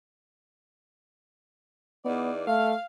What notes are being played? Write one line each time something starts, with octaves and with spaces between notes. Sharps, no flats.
E2 B3 D#4 D5
A3 F5